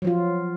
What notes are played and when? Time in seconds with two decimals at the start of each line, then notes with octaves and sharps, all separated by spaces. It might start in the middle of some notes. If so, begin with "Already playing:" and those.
0.02 F#3
0.05 F3
0.07 F4